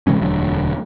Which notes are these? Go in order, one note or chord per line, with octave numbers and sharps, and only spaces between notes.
C3 E3 G#3 C#4
E1 D2 F#3 D4